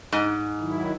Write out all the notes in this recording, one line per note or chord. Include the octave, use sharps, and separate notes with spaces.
G#2
D#3 F#3 E4